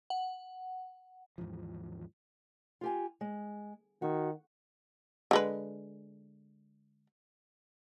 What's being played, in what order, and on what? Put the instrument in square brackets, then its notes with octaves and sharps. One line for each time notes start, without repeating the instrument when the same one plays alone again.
[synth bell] F#5
[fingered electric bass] D#2 G#2 E3 F3
[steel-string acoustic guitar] F4 G4 G#5
G#3
[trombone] D#3 [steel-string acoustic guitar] F#4
[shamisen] D3 G#3 B4